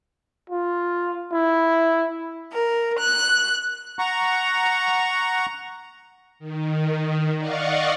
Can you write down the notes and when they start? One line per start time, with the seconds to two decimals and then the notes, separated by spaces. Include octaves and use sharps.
0.50 F4
1.32 E4
2.53 A#4
2.99 F#6
3.99 F#5 A#5 C#6
6.39 D#3
7.38 D5 D#5 F5 F#5 C#6